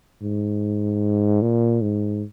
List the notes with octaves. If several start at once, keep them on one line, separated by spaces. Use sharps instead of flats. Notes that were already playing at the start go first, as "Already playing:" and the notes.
G#2
A#2
G#2